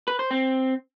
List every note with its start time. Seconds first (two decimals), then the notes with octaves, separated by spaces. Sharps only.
0.08 B4
0.19 C5
0.31 C4